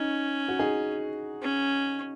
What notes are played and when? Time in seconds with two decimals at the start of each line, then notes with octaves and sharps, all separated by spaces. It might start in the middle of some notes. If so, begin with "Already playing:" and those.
Already playing: C#4 D#4
0.49 F#4
0.59 D#4 G#4
1.42 C#4